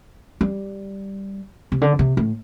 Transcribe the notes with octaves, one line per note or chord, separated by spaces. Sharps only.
G3
C3
D3
C3
A2